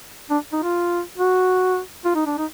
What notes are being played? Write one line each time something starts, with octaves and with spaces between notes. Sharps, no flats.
D4
D#4
F4
F#4
F4
D#4
D4
D#4